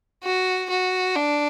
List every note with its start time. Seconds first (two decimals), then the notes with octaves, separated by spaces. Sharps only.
0.23 F#4
0.70 F#4
1.16 D4